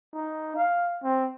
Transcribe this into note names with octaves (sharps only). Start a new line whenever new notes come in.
D#4
F5
C4